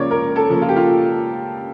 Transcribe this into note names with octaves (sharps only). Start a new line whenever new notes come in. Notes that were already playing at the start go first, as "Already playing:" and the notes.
Already playing: C#2 C#3 F3 A#3 C#5 D5
C#2 A#4
A4
C#3 F3 A#3
F4
G4
F4